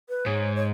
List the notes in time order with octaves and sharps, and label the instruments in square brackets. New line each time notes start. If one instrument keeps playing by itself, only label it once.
[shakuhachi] B4
[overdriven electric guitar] G#2 [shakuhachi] C#5
[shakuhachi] C#5